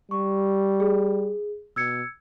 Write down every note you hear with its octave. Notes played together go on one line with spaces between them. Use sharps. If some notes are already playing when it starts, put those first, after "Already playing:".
G3 C#6
G#4
B2 E6 G#6 C#7